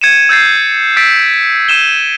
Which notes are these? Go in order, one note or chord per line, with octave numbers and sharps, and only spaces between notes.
G#6 C#7 D#7 E7
E6 G6 A6 C7
E6 A6 B6 D7
E6 D#7 E7 G7